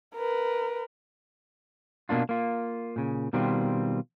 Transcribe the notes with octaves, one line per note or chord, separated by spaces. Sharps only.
A#4 B4
B2 A#3 D4 F4
A#3 F4
A#2 C#3
B2 D#3 G3 C4 F4